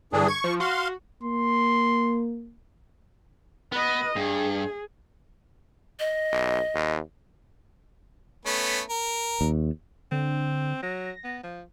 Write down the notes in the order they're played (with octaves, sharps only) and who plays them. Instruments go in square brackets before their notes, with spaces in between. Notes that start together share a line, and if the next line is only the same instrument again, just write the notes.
[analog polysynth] G2 D3 [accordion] E3 D4 G#4
[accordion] C#6 [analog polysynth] G#6
[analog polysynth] F3
[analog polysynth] F#4 [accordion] F5 C6
[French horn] A#3 [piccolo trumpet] C6
[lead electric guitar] B3 [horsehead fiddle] B4 D#5
[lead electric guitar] G2 [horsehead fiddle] G#4
[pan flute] D#5
[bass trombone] B1
D#2
[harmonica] A3 B3 C#4
A#4
[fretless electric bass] D#2
[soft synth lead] D3 [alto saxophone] C4
[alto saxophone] F#3 [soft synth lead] A#6
[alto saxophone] B3
F3